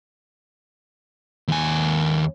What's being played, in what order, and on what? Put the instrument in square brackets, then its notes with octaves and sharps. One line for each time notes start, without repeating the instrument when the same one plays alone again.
[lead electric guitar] D#2 G#5